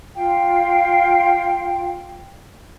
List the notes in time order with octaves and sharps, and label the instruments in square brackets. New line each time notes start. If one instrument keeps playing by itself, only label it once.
[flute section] F4 F5 G5